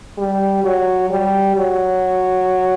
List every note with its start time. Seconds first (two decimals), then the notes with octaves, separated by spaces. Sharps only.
0.18 G3
0.64 F#3
1.10 G3
1.56 F#3